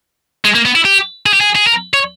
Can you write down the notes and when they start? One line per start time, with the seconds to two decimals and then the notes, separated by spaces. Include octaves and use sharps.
0.45 G#3
0.55 A#3
0.66 B3
0.76 E4
0.85 G4
1.26 G#4
1.33 G4
1.41 G#4
1.55 G#4
1.67 A#4
1.94 C#5